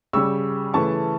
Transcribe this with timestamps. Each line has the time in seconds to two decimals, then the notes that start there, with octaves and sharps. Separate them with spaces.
0.13 C#3 G3 C#4 C#6 E6
0.74 C#3 E3 A3 C#4 A5 C#6